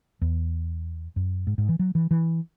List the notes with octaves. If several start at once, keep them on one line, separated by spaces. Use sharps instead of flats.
E2
F#2
G#2
G#2
E3
F#3
E3
E3